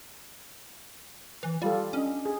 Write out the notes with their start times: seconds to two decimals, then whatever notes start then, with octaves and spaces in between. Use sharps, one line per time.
1.43 E3
1.62 G3 F4 G4 A4
1.93 C#4 D4 D#5
2.25 G#4